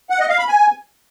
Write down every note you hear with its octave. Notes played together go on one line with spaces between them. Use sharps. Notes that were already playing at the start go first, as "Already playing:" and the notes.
F#5
D#5
F5
B5
G#5